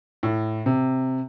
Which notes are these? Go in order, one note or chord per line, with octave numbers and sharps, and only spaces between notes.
A2
C3